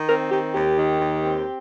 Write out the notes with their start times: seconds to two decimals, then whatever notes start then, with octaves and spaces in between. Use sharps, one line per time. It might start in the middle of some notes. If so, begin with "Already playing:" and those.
Already playing: D#3
0.08 C4 A#4
0.31 D#3 G4
0.54 D#2 G4
0.77 D#3
1.00 D#2
1.24 C4